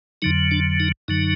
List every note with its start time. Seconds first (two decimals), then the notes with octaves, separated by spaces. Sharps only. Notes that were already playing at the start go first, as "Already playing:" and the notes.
0.22 F2 D3 F#3 D#4
0.51 D4
0.80 D#4
1.08 F#2 D3 F#3 D#4